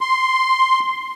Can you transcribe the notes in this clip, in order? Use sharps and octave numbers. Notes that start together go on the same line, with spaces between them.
C6